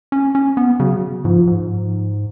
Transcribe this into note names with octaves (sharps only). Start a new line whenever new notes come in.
C#4
C#4
B3
C#3 F#3
G#2 F3
G#2